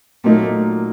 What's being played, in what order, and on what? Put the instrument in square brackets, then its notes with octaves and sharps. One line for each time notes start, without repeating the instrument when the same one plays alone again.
[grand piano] A#2 F#3 A#3 D#4 [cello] A3